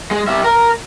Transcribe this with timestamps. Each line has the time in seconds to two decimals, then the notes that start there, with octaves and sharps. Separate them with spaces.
0.11 G#3
0.28 G3 E5
0.44 A#4